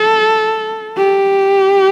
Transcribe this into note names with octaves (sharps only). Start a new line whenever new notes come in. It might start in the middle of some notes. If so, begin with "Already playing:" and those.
Already playing: A4
G4